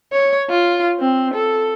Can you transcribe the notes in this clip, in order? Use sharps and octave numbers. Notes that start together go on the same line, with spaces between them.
C#5
F4
C4
A4